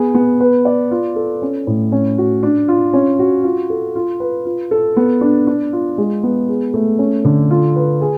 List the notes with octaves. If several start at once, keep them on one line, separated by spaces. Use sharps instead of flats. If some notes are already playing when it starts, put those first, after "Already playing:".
Already playing: B3 G#4
B3
B4
D5
F4
A4
C#4
A2
C#4
F#4
D4
F4
C#4
F#4
F4
A4
F4
B4
F4
A4
B3
D4
D4
F4
G#3
B3
G#4
A3
C#4
D3
F4
B4
G#4